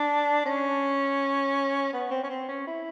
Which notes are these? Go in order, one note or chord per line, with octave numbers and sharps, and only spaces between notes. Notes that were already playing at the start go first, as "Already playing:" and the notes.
Already playing: D4
C#4
B3
C4
C#4
C4
C#4
E4